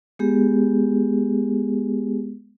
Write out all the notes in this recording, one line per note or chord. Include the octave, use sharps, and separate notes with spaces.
G#3 B3 G4 G#4